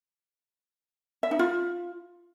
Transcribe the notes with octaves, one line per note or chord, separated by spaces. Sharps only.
E5
D#4
F4